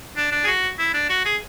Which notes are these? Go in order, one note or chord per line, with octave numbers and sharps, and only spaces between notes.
D4
D4
G#4
F#4
E4
D4
F#4
G#4